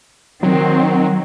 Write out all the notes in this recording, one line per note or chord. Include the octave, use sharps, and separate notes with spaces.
D#3 F#3 C4